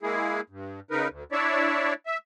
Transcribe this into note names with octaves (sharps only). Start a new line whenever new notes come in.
G#3 A#3 E4 G#4
G2
C#3 D#4 A#4 B4
D2
D4 E4 C#5 D5 E5
E5